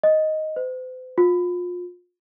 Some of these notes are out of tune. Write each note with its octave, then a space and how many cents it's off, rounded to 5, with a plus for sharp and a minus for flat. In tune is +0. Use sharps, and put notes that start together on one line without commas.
D#5 +5
C5 -45
F4 +30